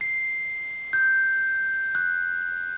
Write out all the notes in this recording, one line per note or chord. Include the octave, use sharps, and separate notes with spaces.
C7
G6
F#6